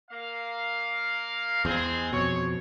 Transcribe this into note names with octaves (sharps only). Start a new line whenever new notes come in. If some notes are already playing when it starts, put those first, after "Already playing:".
A#3 F5
E2 G#3 C4 G#4
F2 B2 C#5